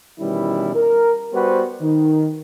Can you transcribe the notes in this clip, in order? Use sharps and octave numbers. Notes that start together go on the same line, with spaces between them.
B2 D#3 E3 G3 C#4 E4
A#4
G3 B3 F#4 B4 C5
D#3